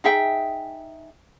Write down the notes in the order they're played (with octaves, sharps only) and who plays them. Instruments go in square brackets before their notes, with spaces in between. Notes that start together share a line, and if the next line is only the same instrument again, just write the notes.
[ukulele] D#4 G#4 E5 G5